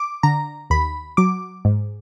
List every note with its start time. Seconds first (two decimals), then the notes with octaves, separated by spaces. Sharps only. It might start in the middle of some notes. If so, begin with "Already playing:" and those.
Already playing: D6
0.23 D3 A#5
0.70 D#2 B5
1.17 F#3 D6
1.65 G#2